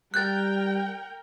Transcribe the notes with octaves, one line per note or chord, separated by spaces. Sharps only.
G3 A#4 G5 F#6 G6 A6